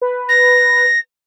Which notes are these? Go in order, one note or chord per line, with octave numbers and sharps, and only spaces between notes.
B4
A#6